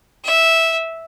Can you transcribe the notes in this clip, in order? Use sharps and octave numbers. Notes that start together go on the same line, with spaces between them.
E5